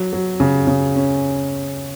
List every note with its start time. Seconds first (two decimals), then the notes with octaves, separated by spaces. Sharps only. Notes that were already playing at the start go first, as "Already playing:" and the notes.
Already playing: F#3
0.13 F#3
0.40 C#3
0.67 C#3
0.95 C#4